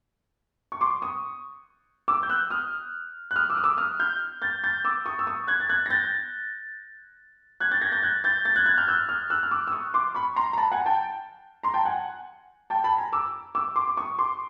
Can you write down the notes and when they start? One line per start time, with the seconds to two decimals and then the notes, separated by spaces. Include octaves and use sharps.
0.72 C#6
0.81 C6 D6
1.02 C#6 D#6
2.08 D6 E6
2.23 G6
2.30 E6 F#6
2.50 D#6 F6
3.31 F#6
3.36 D#6 F6
3.49 D6 E6
3.57 D#6
3.64 D6 E6
3.78 D#6 F6
4.00 F6 G6
4.42 G6 A6
4.64 G6 A6
4.85 D6 E6
5.06 C#6 D#6
5.19 E6
5.27 C#6 D#6
5.47 F#6 G#6
5.60 A6
5.69 F#6 G#6
5.86 A#6
5.90 G6 A6
7.60 F#6 G#6
7.71 G6 A6
7.81 G#6 A#6
7.92 G6 A6
8.03 F#6 G#6
8.24 G6 A6
8.45 G6 A6
8.56 F#6 G#6
8.66 F#6 G#6
8.78 F6 G6
8.87 E6 F#6
9.09 D#6 F6
9.30 E6 F#6
9.43 F6
9.51 D6 E6
9.67 E6
9.72 C#6 D#6
9.94 C6 D6
10.15 B5 C#6
10.36 A#5 C6
10.53 A#5
10.58 A5 B5
10.72 F#5 G#5
10.86 G5 A5
11.63 A#5 C6
11.74 G5 A5
11.85 F#5 G#5
12.70 G5 A5
12.84 A5 B5
12.98 G#5 A#5
13.13 D6 E6
13.55 D6 E6
13.76 C6 D6
13.88 D6
13.97 C#6 D#6
14.19 C6 D6